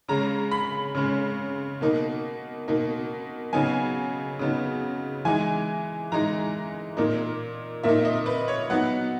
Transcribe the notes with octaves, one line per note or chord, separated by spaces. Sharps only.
C#3 G#3 C#4 A#5
B5
C#3 G#3 C#4
B2 A#3 D#4
B2 A#3 D#4
C#3 F#3 B3 D#4 G#5
C#3 F#3 B3 D#4
E3 G#3 D#4 G#5
E3 G#3 D#4 A#5
A#2 A#3 D#4
A#2 A#3 D#4 E5
D#5
B4
C#5
F#3 B3 D#4 F#5